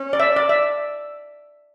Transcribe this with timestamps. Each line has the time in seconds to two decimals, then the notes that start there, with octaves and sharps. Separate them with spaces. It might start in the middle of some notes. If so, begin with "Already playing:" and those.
Already playing: C#4
0.13 D5
0.20 E5
0.36 D5
0.49 E5